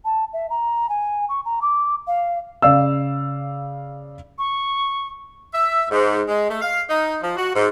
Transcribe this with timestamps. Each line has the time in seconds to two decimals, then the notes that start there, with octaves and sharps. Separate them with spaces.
0.04 A5
0.33 E5
0.49 A#5
0.89 G#5
1.29 C#6
1.45 A#5
1.61 D6
2.07 F5
2.62 C#3 D5 F5 E6
4.38 C#6
5.54 E5
5.90 G#2
6.29 G#3
6.49 A3
6.61 F5
6.90 D#4
7.22 F3
7.37 F#4
7.55 G#2